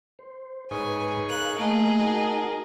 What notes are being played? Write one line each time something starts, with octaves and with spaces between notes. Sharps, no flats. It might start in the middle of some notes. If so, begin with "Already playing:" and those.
C5
G#2 D#4 G#4 B4 C#5 G#5
A#4 F5 F#6
A3 A#3 G#4 D#5
D#4 F#4 A#4 G5 A5